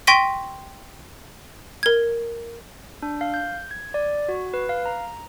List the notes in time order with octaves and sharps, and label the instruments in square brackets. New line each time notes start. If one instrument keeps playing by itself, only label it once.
[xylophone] G5 C6 C#6 A#6 B6 D#7
A#4 G#6
[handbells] D4
F5
G6
G#6
D5
F#4
B4
F5
A#5